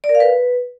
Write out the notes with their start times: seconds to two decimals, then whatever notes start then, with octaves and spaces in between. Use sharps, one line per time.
0.04 D5
0.09 A#4
0.15 F5
0.20 B4